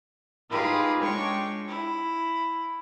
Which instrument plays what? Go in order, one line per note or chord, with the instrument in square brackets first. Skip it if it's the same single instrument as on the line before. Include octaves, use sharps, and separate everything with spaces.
[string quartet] D#4 F4 G4 G#4 A#4 B4
G#3 D4 F4 C#5 G5 C#6
E4